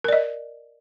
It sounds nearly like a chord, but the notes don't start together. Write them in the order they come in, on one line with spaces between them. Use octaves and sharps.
A#4 D5 D#5